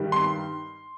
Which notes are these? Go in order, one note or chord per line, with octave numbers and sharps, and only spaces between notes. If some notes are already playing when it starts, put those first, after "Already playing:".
Already playing: G2 D#3 G3
C6